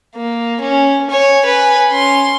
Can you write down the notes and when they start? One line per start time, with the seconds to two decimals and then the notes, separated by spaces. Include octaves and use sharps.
0.16 A#3
0.61 C#4
1.10 C#5 G#5
1.46 B4 G#5
1.91 C#4 C6